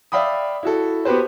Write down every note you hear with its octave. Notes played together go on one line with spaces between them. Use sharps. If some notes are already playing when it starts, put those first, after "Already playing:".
D5 E5 F5 G5 B5 D#6
E4 F#4 A4
B3 F#4 G4 B4 C5